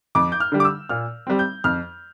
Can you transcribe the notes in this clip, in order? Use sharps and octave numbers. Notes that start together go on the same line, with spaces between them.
F2 D6
G6
F6
D3 G3
D6
E6
A#2 F6
G3 C4
G6
F2 F6